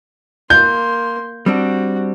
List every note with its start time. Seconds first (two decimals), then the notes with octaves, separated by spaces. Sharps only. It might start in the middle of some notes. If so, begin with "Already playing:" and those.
0.50 A#3 C6 G6
1.46 G3 C4 D4 F#4